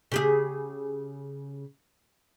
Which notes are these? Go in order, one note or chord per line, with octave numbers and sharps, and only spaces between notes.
C#3 G4 G#4